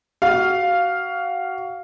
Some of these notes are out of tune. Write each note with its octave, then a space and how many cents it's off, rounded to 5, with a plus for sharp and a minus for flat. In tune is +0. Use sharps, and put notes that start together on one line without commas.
F#4 +20 F5 +0